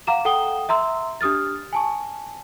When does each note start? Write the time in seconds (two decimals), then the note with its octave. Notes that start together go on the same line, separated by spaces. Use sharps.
0.07 F5 F#5 A#5 D6 E7
0.25 A4 F#5 G5 D#6 G7
0.69 E5 A#5 C6 E6
1.21 D4 G4 D#6 F6 A6
1.73 G#5 A5 C#6